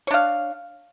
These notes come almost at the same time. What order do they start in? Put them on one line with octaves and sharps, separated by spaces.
C#5 D4 F5